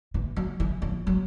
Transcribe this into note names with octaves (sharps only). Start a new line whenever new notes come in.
E3
F#3
E3
F3
F#3